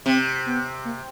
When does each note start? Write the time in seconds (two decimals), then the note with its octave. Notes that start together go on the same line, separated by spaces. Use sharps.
0.06 C3 C4
0.46 B3
0.85 A#3